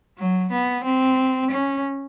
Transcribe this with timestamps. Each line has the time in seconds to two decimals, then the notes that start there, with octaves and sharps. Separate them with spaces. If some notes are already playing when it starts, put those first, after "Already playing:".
0.18 F#3
0.51 B3
0.84 C4
1.50 C#4